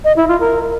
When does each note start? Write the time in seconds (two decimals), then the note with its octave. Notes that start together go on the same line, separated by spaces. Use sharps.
0.05 D#5
0.16 E4
0.28 F4
0.40 A#4